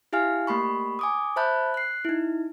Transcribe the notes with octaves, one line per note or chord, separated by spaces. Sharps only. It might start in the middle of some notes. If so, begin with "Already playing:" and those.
E4 G4 F5 G#5 F6
A3 A#3 G4 B5 C#6
G#5 D6 D#6
C5 E5 A5 B5 F#6 G6
F#6 C7
D#4 E4